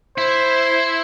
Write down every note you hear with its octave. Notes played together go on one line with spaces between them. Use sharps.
E4 C5